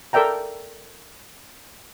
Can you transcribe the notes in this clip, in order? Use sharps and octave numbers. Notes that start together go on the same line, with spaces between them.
A4 A#4 D5 E5 G5 A#5